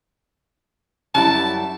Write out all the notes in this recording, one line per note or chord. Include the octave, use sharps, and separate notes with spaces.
F#2 G3 E4 A5